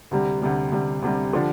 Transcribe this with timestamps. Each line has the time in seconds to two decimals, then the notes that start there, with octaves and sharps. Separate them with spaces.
0.11 D2 C3 G3
0.42 D2 C3 G3
0.72 D2 C3 G3
1.02 D2 C3 G3
1.33 D3 F3 D4 G4